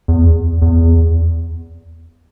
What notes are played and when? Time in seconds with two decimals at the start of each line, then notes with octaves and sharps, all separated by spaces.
0.08 E2
0.62 E2